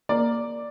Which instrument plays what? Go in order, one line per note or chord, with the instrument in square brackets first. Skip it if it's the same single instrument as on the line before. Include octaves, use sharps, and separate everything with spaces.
[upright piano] A#3 D5